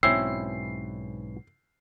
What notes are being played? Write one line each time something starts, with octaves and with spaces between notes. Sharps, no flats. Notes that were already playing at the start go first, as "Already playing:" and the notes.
B1 G#2 B2 C4 C#4 E4 E6 C7